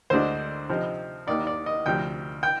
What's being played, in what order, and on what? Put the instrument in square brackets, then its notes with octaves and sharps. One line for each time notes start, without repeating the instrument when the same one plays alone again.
[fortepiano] D2 D3 G#3 D4 C5
C3 F3 C4 D#4
D#2 D#3 A#3 D5
D5
D#5
D2 C3 F3 G5
G5